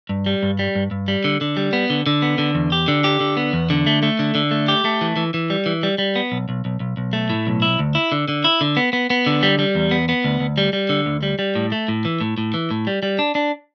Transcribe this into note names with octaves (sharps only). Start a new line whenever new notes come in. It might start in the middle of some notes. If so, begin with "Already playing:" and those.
G2
G3
G2
G3
G2
G2
G3
D3
D3
G3
B3
D3
D3
B3
D3
E2
G4
D3
G4
D3
B3
E2
D3
A3
A3
D3
D3
A3
G4
A3
E3
E3
E3
G3
E3
G3
G3
B3
B1
B1
B1
B1
B1
A3
A2
B1
E4
D2
E4
D3
D3
E4
D3
B3
B3
B3
D3
G3
G3
E2
B3
B3
D2
D2
G3
G3
D3
D2
G3
G3
A2
A3
A2
E3
A2
A2
E3
A2
G3
G3
D4
D4